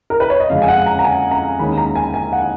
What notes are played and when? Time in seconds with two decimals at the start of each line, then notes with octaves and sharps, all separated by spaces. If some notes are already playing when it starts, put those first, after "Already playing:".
0.10 A#4
0.20 B4
0.30 C#5
0.40 D#5
0.50 F2 C#3 G#3 C#4 F5
0.62 G#5
0.68 F#5
0.86 A#5
0.99 A#5
1.05 G#5
1.31 A#5
1.59 D#2 D#3 G#3 C#4 B5
1.78 A#5
1.96 G#5
2.14 G#5
2.33 F#5